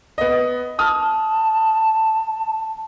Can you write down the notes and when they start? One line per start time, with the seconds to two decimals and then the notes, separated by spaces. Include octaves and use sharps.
0.18 B3 D#5
0.79 A5 D#6 F6